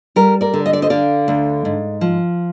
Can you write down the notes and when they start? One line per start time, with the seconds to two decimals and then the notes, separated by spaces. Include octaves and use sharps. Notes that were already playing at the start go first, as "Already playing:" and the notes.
0.16 G3 G4 A#4
0.41 A#4 D5
0.53 D3
0.66 D#5
0.73 D5
0.82 C5 D#5
0.90 D3 D5 F5
1.28 D2
1.65 G#2
2.01 F3